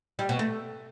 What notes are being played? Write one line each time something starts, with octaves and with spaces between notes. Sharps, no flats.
G3
B2
A3